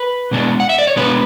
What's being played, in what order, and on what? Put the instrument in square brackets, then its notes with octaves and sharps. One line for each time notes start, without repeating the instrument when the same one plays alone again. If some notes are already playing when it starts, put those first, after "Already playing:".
Already playing: [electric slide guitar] B4
B2 G#3 B3 D4
F#5
E5
D5
C#5
B2 G#3 B3 D4 B4